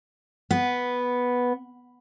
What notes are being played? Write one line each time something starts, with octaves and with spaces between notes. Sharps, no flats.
B3